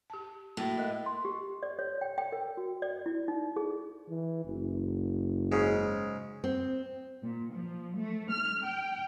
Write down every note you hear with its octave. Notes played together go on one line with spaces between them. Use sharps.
G4 A5
A2 A#3 F#4
A3 A#4 D#5
C6
G4
D5
C#5
G5
G5
A#4
F#4
D5
E4
D#4
G#4
E3
F#1
G#2 C#3
C4
A#2
F3
A3
F6
G5